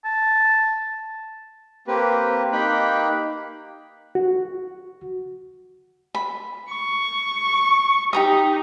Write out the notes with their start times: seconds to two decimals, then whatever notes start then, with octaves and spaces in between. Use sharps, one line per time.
0.05 A5
1.88 A#3 C4 G4 B4
2.52 A#3 D#4 G4 G5 B5 F#6
4.15 F#4
6.15 B5
6.70 C#6
8.13 D#4 G4 A#5 D#6